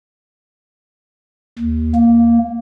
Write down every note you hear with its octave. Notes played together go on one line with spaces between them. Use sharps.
D#2
A#3